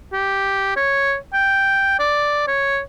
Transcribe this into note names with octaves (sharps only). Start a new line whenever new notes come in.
G4
C#5
G5
D5
C#5